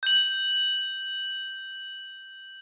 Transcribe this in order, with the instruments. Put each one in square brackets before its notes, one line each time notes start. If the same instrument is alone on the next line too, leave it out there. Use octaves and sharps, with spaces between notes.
[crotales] G6 F#7